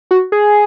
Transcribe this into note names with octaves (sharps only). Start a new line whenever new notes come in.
F#4
G#4